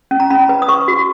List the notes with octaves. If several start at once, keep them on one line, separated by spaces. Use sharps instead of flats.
C#4
A#5
C#4 B5
B4
D#6
B4 C#6
F#4